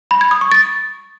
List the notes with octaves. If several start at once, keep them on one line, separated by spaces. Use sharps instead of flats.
B5
G#6
D#6
C#6
A6